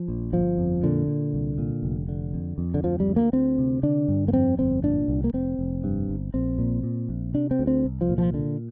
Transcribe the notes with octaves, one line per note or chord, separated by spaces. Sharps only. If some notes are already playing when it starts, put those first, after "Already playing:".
Already playing: F3
A#1
G1 F3
F2
A#2 D3
A#2
C2
A#2
F1
D3
F2
F2
D3
D2 F3
G3
D2
A#3
D2 C4
C3
D3 D4
G2
A#3
F2 C4
G1 C4
A#2 D4
C2
A#3
F1 C4
F1
G2
G1
A#1 C4
A#2
A#2
A#1
C3 D4
C4
D2
C4
C2
F3
A#2
F3
D3